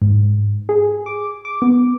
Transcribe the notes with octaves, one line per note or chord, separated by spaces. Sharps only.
G#2
G#4
D6
D6
B3